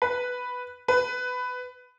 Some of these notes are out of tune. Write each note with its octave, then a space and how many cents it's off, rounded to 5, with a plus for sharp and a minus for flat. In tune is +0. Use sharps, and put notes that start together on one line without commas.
B4 +0
B4 +15